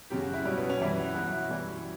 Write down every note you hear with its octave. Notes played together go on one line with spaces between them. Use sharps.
F#2 C#3 F#3 G4
F#4
E4
B2 G3 C#4
B3
C#4
F#2 E3 G3 E4
F#4
B2 F#3 F#4
F#4
E4
F#2 E3 G3